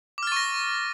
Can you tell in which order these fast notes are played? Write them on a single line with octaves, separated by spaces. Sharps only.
D6 F6 A6 C#6 A#6